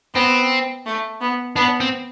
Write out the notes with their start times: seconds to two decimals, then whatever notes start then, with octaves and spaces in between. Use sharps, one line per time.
0.14 B3 C4
0.86 A3
1.21 B3
1.56 B3 D4
1.80 C4